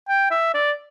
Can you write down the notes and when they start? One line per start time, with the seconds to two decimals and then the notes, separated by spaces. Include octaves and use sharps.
0.09 G5
0.31 E5
0.54 D5